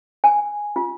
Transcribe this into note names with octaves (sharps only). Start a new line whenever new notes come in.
G#5
F4